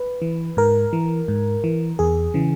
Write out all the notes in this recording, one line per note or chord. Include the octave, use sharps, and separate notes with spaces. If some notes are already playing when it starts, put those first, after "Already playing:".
Already playing: B4
E3
G#2 A#4
E3
G#2
E3
E2 G#4
C#3 E3